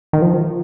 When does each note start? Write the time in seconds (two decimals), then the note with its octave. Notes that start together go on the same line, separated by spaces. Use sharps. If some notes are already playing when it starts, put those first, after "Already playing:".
0.13 D#3
0.22 F3